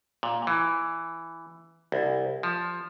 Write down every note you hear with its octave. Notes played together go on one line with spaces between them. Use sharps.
A#2
E3
C2
F3